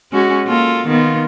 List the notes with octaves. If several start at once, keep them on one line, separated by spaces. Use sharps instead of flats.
G#3 C#4 F#4
A#3 F4 A4
D#3 B3 F4